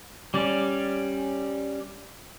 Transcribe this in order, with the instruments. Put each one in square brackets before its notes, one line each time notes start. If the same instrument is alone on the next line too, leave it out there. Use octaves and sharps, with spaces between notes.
[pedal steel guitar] G3 C#4 D5